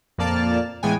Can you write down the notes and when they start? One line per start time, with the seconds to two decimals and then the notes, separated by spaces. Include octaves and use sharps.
0.18 F2 A#2 A#3 D5 A5 F6
0.83 A2 E3 G#3 B3 G5 G#5